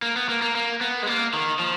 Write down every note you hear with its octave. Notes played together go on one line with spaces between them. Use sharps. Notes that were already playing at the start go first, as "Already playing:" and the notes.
A#3
B3
A#3
A#3
A#3
B3
G#3
A#3
D#3
F3